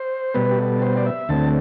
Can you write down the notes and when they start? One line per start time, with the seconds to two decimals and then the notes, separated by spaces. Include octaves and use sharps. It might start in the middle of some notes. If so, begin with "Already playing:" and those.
Already playing: C5
0.34 B2 G3 B3 B4
0.51 G4
0.58 A4
0.82 C5
0.97 D5
1.06 E5
1.29 D2 D3 A3 C4 A5